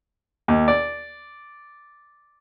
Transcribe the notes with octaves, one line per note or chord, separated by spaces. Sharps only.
D#2
D5